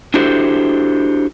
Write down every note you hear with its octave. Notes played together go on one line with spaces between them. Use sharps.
D4 E4 F#4 G4 A4 C5